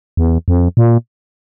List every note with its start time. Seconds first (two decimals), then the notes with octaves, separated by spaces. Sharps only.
0.17 E2
0.48 F2
0.77 A#2